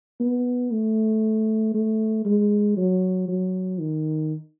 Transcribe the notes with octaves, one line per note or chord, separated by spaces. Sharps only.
B3
A3
A3
G#3
F#3
F#3
D#3